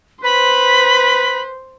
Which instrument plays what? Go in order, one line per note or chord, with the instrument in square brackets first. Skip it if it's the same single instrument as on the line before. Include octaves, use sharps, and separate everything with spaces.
[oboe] B4 [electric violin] C5 [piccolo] B5